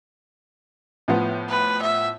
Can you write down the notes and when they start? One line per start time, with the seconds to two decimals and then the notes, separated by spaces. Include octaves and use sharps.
1.08 A2 F3 B3
1.49 B4
1.82 E5